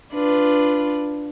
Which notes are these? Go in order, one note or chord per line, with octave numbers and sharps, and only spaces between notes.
D4 F4 B4